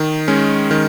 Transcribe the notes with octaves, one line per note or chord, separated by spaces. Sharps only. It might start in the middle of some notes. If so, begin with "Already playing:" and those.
Already playing: D#3
G#3 C#4
D#3